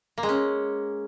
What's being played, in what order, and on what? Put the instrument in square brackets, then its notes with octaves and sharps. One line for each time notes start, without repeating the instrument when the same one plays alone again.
[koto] A#3
G#3
C#4